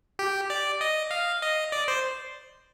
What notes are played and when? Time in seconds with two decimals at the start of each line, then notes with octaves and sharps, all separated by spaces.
0.19 G4
0.50 D5
0.81 D#5
1.11 F5
1.42 D#5
1.72 D5
1.88 C5